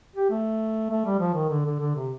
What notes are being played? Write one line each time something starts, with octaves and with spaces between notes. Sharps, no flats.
G4
A3
A3
G3
F3
D#3
D3
D3
D3
C3